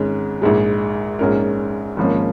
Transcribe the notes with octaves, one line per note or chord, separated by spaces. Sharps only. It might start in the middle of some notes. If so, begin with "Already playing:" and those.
Already playing: G#1 G#2 G#3 C#4
A#1 G#2 G#3
A#1 G#2 G#3 C#4 A#4
G#1 G#2 F3 A#3 C#4